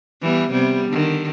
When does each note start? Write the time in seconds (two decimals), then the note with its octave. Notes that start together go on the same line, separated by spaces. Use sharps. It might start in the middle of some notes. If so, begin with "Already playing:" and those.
0.21 E3 G3 B3
0.52 C3 G3 B3
0.89 D3 D#3